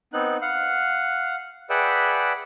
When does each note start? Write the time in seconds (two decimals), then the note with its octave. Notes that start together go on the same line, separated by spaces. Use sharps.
0.13 B3 C4 D#4 F#6
0.42 F5 F#5
1.70 G#4 B4 D5 E5 F#5 G5